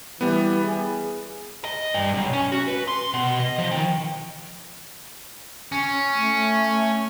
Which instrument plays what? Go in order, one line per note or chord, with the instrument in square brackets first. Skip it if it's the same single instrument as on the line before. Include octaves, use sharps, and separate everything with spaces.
[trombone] E3 [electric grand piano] G3 B3
[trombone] G#4
[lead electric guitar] D#5
G2
B1
C#4
F#4
B4
C6
B2
D#5
F3
D#3
[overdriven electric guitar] C#4
[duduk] A3